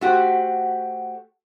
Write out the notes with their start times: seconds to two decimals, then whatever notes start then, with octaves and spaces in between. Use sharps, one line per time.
0.01 A3 F#4 G4 C5